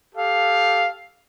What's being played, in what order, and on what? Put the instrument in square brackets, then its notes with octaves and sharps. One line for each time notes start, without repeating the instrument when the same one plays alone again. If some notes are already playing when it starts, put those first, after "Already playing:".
[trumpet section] G4 A4 F5